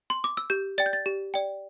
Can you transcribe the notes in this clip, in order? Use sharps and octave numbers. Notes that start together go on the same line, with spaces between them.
C6
D6
E6
G4 G6
D5 G5 A6
G6
A6
G4
D5 G5